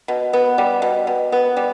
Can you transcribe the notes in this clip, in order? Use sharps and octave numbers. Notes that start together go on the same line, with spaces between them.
B2
B3
G3
B2
B2
B3
G3